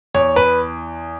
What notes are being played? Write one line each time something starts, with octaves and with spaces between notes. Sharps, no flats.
E2 C#5
B4